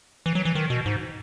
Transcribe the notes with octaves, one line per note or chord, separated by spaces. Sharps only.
E3
F#3
E3
D#3
B2
G#2